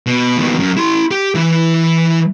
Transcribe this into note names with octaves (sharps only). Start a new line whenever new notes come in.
B2
D#2 B2
F#2
E4 C6
G4
E3 E4